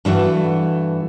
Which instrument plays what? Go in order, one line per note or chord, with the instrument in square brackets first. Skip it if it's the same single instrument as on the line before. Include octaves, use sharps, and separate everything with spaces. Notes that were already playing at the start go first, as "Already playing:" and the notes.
[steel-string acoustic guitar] G2 E3 A3 F#4